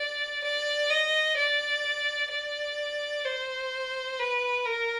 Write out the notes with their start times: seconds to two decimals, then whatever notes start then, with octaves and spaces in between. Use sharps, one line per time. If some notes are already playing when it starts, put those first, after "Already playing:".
Already playing: D5
0.44 D5
0.90 D#5
1.37 D5
2.31 D5
3.25 C5
4.19 B4
4.66 A#4